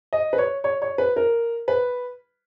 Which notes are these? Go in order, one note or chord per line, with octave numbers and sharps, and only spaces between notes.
D#5
B4
C#5
C#5
C#5
B4
A#4
B4